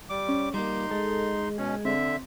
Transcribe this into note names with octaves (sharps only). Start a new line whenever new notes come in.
G3 D6
C#4
G3 A#3 D#4 C6 D6
G#3 A4
B2 C#4 G#4
D3 C4 E5